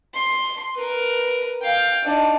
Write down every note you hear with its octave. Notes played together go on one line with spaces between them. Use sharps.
C6
A#4 B4
F5 G5
D4 D#4